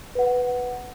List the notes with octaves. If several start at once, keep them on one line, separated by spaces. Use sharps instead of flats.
B4 F#5